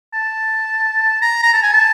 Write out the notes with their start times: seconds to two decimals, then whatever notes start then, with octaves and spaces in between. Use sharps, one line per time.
0.14 A5
1.22 A#5
1.43 A#5
1.54 A5
1.63 G#5
1.73 A5